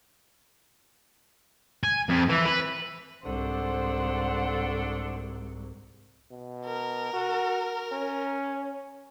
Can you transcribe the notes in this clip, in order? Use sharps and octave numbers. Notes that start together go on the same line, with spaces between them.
G#5
F2
E3
B4
C2 G#2 D4 A4 C5 F#5
B2
A#4
F#4
C#4